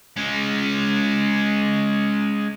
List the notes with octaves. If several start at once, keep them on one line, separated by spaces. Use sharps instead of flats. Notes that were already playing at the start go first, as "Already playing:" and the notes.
G#3 C#4